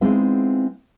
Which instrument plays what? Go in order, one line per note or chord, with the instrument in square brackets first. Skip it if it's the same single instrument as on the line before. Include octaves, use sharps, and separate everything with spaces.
[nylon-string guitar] G#3 B3 C4 D#4 E4 F5